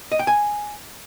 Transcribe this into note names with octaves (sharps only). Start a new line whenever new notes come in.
D#5
G5
G#5